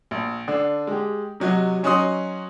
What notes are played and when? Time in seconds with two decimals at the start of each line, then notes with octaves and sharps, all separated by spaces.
0.11 A#1
0.48 D3 D4
0.87 G#3 G4
1.40 C3 F#3 F#4 D#5
1.83 F#3 C#4 D#4 F#4 C6 D#6